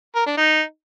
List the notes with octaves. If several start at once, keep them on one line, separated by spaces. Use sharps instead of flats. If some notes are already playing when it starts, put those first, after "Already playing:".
A#4
D4
D#4